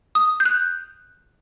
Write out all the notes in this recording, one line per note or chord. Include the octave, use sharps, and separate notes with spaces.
D#6
G6
F#6